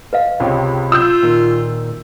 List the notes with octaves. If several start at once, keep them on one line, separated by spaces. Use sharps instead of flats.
B4 D#5 F5
C#2 C3 G4 C#5
F4 E6 G6
A#2 D#3